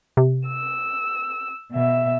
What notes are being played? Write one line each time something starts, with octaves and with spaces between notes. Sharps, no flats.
C3
E6
B2 E5